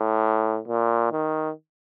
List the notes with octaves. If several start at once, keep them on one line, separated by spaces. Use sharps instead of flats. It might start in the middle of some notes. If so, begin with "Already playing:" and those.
Already playing: A2
A#2
D#3